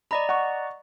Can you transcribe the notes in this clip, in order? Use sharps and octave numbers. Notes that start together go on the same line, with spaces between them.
D5 D#5 A#5 B5
F#5 C#6